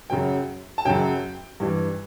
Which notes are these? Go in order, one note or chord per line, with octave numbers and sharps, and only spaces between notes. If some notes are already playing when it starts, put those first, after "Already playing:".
F#2 C#3 F#3 G5
A5
F#2 C#3 F#3 G5
G2 E3 G3